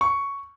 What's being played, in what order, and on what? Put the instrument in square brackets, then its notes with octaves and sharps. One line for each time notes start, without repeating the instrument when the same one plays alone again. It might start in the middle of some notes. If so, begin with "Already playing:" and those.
[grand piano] C#6